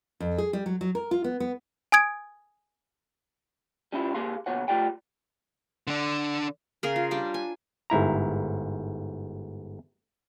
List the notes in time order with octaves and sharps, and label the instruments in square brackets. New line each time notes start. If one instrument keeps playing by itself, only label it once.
[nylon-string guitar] F2
G#4
G3
F#3
F#3
A#4
F4
B3
B3
[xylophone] G#5 D#6 G#6 D7
[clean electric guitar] G3 C#4 D4 E4 F4
C3 A#3 G4 G#4 F5 C6
A#2 C#3 B3 F#4 C#5 F#5
C2 A3 F4 G4 D5 G5
[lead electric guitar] D3 D4
[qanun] C#3 G#4 A#4
F4
G3 D4 G4
G#5
[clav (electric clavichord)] G1 G#2 E4 A#5